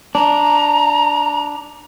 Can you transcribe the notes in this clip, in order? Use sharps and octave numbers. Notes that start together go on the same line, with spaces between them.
D4 A#5